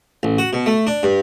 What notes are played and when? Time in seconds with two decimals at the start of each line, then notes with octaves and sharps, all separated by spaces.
0.23 A1
0.38 F#4
0.53 B2
0.66 A3
0.87 D4
1.03 G2